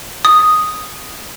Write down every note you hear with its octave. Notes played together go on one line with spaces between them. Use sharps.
D#6